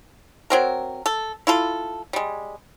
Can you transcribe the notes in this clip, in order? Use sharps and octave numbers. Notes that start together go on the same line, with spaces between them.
F#3 C4 A#4
A4
E4 F4 A4
G3 G#3